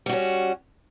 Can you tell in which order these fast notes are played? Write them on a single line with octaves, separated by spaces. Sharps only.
G3 F#4 C#4